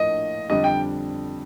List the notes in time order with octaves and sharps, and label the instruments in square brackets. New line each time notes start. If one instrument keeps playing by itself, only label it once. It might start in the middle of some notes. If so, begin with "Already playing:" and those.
Already playing: [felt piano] A#1 A2 F3 A#3 D4 [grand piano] D#5
[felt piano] F2 D3 G3 D4 [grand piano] D#5
[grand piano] G5